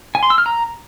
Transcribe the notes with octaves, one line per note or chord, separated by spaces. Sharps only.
G#5
C6
E6
F6
A#5